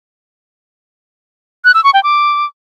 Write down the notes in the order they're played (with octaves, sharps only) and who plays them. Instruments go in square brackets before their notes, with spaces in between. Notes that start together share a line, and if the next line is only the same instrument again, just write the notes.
[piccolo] F#6
E6
C#6
G5
D6